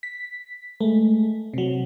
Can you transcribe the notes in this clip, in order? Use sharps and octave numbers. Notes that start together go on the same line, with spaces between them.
B6
G#3 A3
C3 F#3